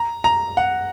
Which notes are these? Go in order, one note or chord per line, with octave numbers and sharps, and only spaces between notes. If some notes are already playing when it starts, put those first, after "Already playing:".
Already playing: A#5
A#5
F#5